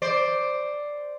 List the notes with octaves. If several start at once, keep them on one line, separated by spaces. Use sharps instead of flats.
C5 D5